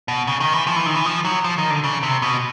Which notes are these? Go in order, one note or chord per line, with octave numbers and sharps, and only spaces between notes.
B2
C#3
D#3
E3
F3
E3
D#3
E3
F3
F#3
F3
D#3
D3
C#3
C3
B2